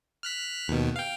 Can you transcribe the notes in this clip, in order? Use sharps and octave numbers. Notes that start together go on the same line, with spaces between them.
F6 F#6 B6
D#2 B2
F5 G5